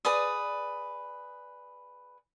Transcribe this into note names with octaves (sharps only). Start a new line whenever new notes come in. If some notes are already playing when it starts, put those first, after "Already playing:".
G#4 B4 D5 D#6